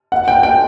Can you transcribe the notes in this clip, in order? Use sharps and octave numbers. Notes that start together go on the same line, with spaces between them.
F#5
G5
G5